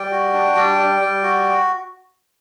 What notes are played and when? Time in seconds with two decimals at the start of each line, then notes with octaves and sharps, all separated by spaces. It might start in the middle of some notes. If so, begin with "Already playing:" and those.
Already playing: G3 G5
0.12 F#4
0.34 D4
0.56 G3
0.78 G3
1.00 G3
1.23 F#4